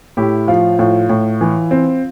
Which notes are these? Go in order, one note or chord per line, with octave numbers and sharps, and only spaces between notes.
A2 E4 G4
F3 F4
A2 F4
A2
E3
C4